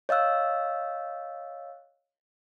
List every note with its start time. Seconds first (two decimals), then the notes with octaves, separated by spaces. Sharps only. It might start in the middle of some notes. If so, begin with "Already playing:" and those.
0.09 C#5 D#5 F5 E6 F#6